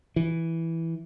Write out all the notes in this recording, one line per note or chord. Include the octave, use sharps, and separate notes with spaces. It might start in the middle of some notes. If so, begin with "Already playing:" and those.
E3